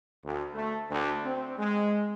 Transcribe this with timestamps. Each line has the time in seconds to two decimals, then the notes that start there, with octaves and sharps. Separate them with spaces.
0.24 D2
0.54 A3
0.90 D2
1.25 C4
1.58 G#3